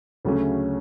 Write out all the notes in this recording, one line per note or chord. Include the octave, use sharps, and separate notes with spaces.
D2 C#3 F#3 A3 C#4